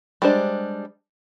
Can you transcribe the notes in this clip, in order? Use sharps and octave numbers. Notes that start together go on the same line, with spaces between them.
G3 G#3 D4 C5